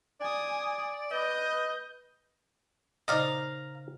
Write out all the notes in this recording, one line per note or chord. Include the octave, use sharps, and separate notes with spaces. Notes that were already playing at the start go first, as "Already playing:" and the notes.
D5 G#5 D#6
B4 D#5 G6
A#2 C#3 D#4 C5 D5 D#5 F5 A#5